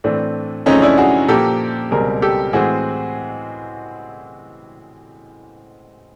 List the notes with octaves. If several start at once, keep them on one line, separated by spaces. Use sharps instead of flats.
A2 E3 A3 C4 D4
F#2 C#3 F3 A3 C4 C#4 D#4
D4 E4
F#4 G#4
A#2 F3 A#3 G4 A4
C#2 B2 G3 C4 G#4 A#4
G4 A4
A2 E3 G#3 C4 F#4 G#4